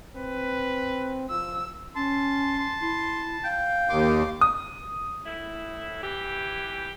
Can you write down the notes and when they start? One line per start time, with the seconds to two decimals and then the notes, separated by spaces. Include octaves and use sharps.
0.16 C4 B4
1.30 F3 E6
1.96 C#4 A5 C6
2.60 C6
2.81 E4 C6
3.44 F5 G5
3.89 D#2 C6 D6
4.41 D#6
5.25 A2 E4
6.03 E3 G4